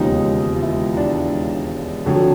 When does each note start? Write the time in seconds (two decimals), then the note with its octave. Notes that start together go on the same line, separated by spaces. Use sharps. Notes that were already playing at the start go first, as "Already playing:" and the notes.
Already playing: E1 D#2 C#3 F3 G#3 D#4
0.55 F4
0.61 E4
0.97 D4
2.06 F2 D3 F#3